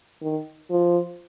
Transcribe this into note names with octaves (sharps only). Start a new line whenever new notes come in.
D#3
F3